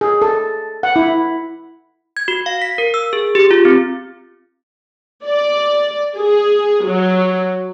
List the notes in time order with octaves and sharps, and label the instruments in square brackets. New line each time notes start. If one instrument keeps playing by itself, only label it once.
[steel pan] G#4
A4
F#5
E4
[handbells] G#6
F#4
F5
B6
A#4
E6
G#4
G4
F4
C4
[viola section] D5
G#4
F#3